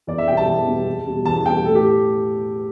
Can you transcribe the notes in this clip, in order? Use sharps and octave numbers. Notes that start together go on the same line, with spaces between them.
E2 D5
E5
B2 G3 G5
A5
E2
B2 G3
E2
B2 G3
E2 A5
B2 G3 G5
A2 A4
G4